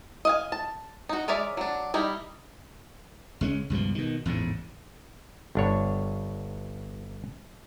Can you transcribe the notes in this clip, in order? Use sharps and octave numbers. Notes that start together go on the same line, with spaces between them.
D#5 F5 G#5
A5
D#4 F#4
G#3 A#4 C#5 D5 E5
F#3 D4
G3 D#4 E4
C#2 G#3 C#4
C#2 G2 B2 F3
B2 D#3
A1 E2 G#2 C#3
G1 D4 C#5